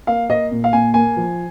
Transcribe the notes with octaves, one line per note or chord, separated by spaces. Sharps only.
A#3 F5
A#3 D#5
A#2
F5
A#2 G#5
A#3 G#5
F3